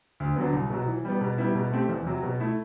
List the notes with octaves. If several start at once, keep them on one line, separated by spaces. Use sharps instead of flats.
D2
D3 F#3 B3
C2
B2 F#3
E3
G3 B3
B2
G3 B3 E4
B2
A3 C4 G4
E2
C3 F#3
B2
A3 E4